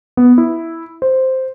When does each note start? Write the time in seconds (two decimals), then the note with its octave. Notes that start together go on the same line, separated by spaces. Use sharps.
0.17 B3
0.38 E4
1.02 C5